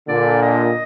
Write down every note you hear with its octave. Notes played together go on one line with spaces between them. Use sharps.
A#2 D3 D5
D#5